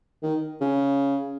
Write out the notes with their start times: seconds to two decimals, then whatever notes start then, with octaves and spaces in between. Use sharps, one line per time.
0.23 D#3
0.61 C#3